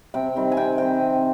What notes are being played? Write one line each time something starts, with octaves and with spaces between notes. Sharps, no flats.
C3 G5
D#3 G3 C4
G#5
C3 G5
D#3 G3 C4 G5
C3